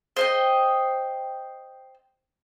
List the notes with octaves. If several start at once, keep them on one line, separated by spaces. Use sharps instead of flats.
C5 D#5 G5